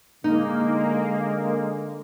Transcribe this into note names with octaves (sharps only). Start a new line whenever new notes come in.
D3 G#3 A#3 D#4